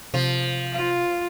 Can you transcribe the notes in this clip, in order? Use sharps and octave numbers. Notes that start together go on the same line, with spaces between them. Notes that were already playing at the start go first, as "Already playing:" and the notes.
C3 F3
F4